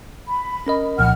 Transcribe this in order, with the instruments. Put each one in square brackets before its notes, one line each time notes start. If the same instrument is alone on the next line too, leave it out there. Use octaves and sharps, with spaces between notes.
[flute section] B5
[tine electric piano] C#4 A#4 D#5
[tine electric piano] C2 A#2 F3 [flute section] F#5 F6